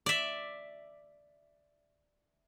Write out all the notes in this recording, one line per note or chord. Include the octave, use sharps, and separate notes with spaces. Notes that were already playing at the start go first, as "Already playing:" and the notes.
D5 E5